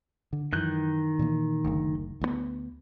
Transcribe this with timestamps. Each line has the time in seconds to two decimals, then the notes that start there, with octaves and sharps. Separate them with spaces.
0.33 D3
0.53 F#2 D#3 E3 F#6 G6
1.19 A#2 E3 A#3
1.64 F#1 D2
2.21 D2 D#3 B3